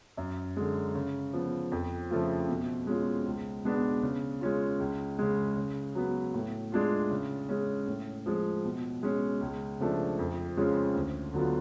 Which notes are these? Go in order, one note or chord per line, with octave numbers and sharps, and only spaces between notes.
F#2
D3 G#3
C#3
F3 B3
F2
C#3 F3 A3 F4
B2
G#3 C#4 F4
C#2
B2 G#3 B3 D4
C#3
G#3 C#4 F4
C#2
C#3 G#3
C#3
F#3 B3
A2
G#3 D4 F4
C#3
G#3 C#4
A2
F3 G#3
B2
G#3 C#4
C#2
C#3 F3 A3 D4
F2
C#3 G#3 C#4 F4
D2
D3 F#3 B3 F4